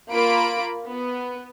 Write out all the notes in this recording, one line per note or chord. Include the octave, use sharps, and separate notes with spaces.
A#3 F4 B5 D7
B3